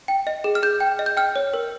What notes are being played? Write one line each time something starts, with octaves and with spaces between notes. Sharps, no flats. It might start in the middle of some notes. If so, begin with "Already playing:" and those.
G5
D#5
G#4
F6
G#4 G6
G5
D#5
G6
G5 F6
C#5
A#4